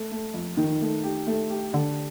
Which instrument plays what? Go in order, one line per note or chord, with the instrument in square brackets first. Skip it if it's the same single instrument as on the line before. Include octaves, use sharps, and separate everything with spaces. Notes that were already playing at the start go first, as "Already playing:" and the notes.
Already playing: [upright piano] A3
A3
F2
D#3
A3
G4
A3
G4
[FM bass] D3 [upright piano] D4